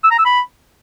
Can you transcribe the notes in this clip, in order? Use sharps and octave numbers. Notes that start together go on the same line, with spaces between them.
E6
A#5
E6
B5